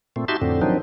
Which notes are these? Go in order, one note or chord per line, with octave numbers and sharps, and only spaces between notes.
A#2 A3 C4
D#4 F#4 G4 E5 A5 C6
F2 A2 D3 C4
D#3 F3 F#3 C4 D4 D#4